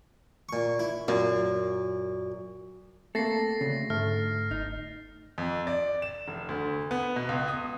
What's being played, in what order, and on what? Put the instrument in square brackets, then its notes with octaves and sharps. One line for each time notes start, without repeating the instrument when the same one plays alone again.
[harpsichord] A#2 C#6
E4
[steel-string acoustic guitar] F#2 [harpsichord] A#2
[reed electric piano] A3 A#3 [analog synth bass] C4 [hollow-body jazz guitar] A4 [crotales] A6 A#6 C7
[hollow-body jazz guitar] D2 [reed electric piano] C#3
[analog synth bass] G#2 [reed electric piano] A3 [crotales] F6
[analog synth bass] G1 [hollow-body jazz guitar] D#4
[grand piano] F2
D5
E7
F1
D2
B3
B2
C#2
D#6